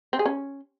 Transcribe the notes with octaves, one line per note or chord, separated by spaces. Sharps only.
C4
G#4
C#4